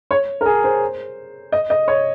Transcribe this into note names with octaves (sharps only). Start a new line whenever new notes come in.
C#5
A#4
G#4
C5
D#5
D#5
C#5